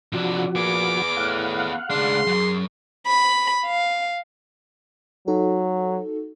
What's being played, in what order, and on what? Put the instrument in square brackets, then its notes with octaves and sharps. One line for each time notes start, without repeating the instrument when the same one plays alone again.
[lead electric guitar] C3 D4 [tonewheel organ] F3 F#4
[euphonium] A#2 [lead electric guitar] B3 G#4 [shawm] D6
[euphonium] A2 [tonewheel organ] F5 F#5
[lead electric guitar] C#2 D4 [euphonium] G#4 [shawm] C6
[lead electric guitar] F#2
[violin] B5
F5
[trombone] F#3 [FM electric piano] D#4 F#4 A4